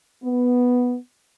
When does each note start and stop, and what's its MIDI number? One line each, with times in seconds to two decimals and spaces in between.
0.24 0.96 59